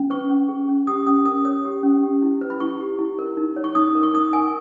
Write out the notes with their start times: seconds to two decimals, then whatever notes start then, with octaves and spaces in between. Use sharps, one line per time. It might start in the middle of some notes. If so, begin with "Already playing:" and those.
Already playing: C#4
0.10 B4 C#6
0.29 C#4
0.49 G#4
0.69 C#4
0.87 G4 D#6
1.06 C#4 D#6
1.25 A#4 D#6
1.45 C#5 D#6
1.65 G4
1.83 C#4
2.03 G4
2.22 E4
2.41 B4
2.50 B5
2.60 E4 C#6
2.80 G4
2.99 E4
3.19 A#4
3.37 D#4
3.56 C#5
3.64 C#6
3.75 D#4 D#6
3.95 A#4
4.03 C#6
4.14 D#4 D#6
4.33 A#4 G#5